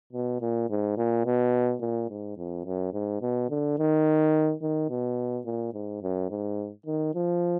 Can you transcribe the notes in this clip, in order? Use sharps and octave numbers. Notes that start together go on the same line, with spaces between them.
B2
A#2
G#2
A#2
B2
A#2
G#2
F2
F#2
G#2
B2
D3
D#3
D#3
B2
A#2
G#2
F#2
G#2
D#3
F3